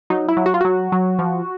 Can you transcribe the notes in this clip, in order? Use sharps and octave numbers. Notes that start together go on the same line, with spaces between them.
F#3 D#4
E4
F#3
F#4
F4
F#3 F#4
F#3
F3